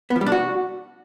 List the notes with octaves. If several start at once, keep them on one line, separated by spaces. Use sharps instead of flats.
B3
F3
G3
D4
F#4